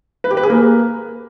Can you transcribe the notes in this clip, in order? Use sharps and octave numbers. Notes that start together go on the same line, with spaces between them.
B4
G4
B4
G#4
A#3